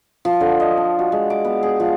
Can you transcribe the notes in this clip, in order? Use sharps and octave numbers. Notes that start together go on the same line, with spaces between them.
F3
D3
D#5
D4
F#4
G#3
D6
B3
G#4
F3